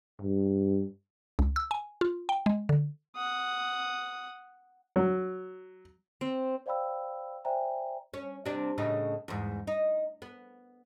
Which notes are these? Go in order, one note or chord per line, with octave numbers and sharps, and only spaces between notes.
G2
C#2
E6
G#5
F4
G5
G#3
D3
F#5 D#6
F#3
C4
C5 D5 F5 G5 B5 E6
C5 D5 E5 G5 G#5 A#5
C#4
C3 D4
A2 C#3 D#4
E2 G#2
D#4
B3